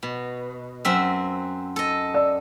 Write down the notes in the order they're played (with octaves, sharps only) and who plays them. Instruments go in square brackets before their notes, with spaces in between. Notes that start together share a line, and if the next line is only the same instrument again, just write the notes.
[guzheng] B2
F#2 C4 E5
A4 D#5
[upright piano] D5 E6